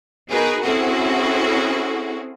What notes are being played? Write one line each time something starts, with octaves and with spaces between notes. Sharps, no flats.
B3 D#4 F#4 G#4 A#4 B4
C4 C#4 E4 F#4 G#4 A4